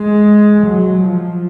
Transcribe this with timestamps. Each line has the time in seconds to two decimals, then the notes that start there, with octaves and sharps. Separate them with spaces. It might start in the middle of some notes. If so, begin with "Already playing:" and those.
Already playing: G#3
0.66 F#3
1.02 F3